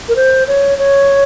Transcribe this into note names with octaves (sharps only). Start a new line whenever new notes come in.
A#4
C5
C#5
C#5